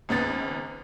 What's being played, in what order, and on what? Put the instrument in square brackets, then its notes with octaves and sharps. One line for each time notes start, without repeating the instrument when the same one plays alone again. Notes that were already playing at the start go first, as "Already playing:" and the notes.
[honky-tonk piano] G#1 C#2 B3 A6